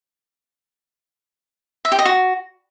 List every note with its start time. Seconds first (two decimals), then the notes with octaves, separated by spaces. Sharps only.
1.85 E5
1.92 G4
1.99 D#5
2.05 F#4